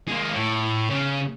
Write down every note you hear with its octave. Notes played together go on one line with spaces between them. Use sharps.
G#3 A#3
A2
C#3